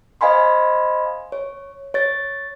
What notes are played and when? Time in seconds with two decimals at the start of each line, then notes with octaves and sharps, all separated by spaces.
0.21 C5 D#5 F5 G#5 B5 C6
1.32 C#5
1.94 C#5 A6